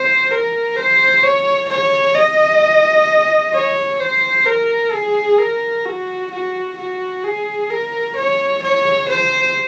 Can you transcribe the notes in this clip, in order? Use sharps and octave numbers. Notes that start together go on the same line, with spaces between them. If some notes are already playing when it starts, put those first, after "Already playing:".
Already playing: C5
A#4
C5
C#5
C#5
D#5
C#5
C5
A#4
G#4
A#4
F#4
F#4
F#4
G#4
A#4
C#5
C#5
C5